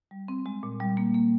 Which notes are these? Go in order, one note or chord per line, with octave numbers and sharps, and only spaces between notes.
G3
C4
G#3
A#2
G3
A#3
A#3